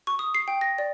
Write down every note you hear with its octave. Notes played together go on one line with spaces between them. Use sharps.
C#6
D#6
C7
G5
A#6
D5